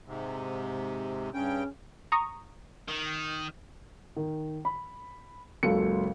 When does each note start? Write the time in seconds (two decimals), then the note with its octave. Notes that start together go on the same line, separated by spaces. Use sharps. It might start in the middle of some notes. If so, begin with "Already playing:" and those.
0.07 G#2 C3
1.34 G2 C#3 C#4 G5
2.12 A#5 C#6 D#6
2.88 D#3
4.16 D#3
4.65 B5
5.63 F#1 C#2 F#3 A4 C#7